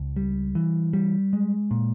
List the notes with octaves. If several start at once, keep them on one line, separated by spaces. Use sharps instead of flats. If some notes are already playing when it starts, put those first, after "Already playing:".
Already playing: C#2
G3
E3
G3
G#3
A#2